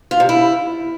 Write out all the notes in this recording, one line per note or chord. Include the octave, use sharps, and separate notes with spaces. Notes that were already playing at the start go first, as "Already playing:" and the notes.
F4
C3
E4